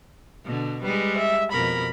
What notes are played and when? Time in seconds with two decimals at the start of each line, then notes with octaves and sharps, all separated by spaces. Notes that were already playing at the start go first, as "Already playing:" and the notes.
0.44 B2 D3
0.83 G3 G#3 B4
1.18 E5
1.52 F2 B2 A#4 B5